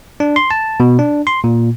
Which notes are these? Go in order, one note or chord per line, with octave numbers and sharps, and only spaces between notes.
D4
C6
A5
B2
D4
C6
A#2